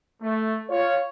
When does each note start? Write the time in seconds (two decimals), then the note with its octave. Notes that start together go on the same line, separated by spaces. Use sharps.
0.22 A3
0.69 F4 C#5